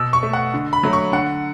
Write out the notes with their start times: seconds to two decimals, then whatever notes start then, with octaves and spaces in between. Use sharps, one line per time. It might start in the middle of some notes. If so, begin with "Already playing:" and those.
Already playing: B2 E6
0.13 C#6
0.23 A3
0.33 F#5
0.54 D3
0.73 B5
0.83 F#3 A3
0.93 C#6
1.13 D3 F#5